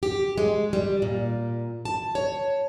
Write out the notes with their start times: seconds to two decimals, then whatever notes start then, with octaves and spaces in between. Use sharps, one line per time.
0.03 G4
0.38 G#3
0.73 G3
1.02 A#2
1.85 A5
2.15 C#5